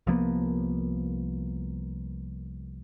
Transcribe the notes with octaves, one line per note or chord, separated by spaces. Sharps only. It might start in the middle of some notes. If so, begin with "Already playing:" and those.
C2 F3 A#3 B3